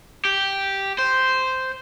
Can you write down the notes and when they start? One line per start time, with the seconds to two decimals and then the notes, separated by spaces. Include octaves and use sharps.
0.25 G4
0.99 C5